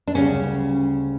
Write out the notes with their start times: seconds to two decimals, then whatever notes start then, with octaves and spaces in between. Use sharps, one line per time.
0.07 D4
0.14 D2 C#3 G3 C#4